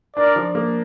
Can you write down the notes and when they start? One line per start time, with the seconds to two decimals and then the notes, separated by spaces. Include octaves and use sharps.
0.17 D4 A#4 D5
0.36 F3
0.55 A#3